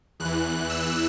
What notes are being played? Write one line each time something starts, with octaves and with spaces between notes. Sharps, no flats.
E2 F#6
E3
E6